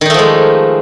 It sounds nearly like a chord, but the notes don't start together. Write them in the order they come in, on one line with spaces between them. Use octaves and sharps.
D#3 D#4 A3 F3 G#3